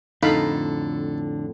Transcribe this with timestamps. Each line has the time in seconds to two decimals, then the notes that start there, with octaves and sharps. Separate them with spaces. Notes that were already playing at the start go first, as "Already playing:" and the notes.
0.23 F2 A2 D3 D#4 A4 F5 B5